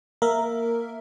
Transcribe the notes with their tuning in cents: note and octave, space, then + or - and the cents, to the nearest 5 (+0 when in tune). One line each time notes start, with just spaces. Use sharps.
A#3 +0 A#4 -5 E5 +0